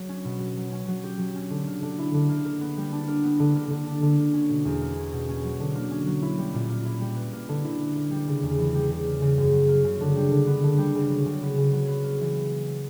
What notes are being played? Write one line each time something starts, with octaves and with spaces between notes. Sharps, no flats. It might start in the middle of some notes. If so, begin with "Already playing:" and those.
Already playing: F#3
C#4
B2
F#3
F#3
C#4
F#3
G4
F#3
C#4
D3
A#3
D3
E4
D3
A#3
A#4
B3
G3
D4
A#4
B3
D3
A#3
D3
D4
D3
A#3
C#4
B2
E2
A#3
C#4
B2
C#4
F#3
D3
A#3
C#4
F#3
E4
G3
A#2
A#3
E4
G3
B4
A#3
D3
E4
B4
A#3
G3
C#3
E2
E3
G3
C#3
A#3
C#3
F#2
F#3
A#3
C#3
D3
G3
D3
B3
D3
G3
C#3
F#3
C#3
B3
C#3
F#3
B4
A#3
E3